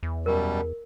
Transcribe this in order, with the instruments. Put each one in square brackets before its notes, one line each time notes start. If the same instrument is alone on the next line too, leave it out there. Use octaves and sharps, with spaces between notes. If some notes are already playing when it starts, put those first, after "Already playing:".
[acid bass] E2
[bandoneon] F#2 B2 G3 [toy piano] A#4